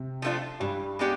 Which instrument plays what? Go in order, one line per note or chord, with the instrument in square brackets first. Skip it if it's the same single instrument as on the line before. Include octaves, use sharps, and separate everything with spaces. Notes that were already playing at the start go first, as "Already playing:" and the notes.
Already playing: [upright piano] C3 C4
[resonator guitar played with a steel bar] F3 A3 D4 F4
[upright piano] G2 G3 [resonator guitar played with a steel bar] E3
[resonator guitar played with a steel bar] G#3 B3 D4 G4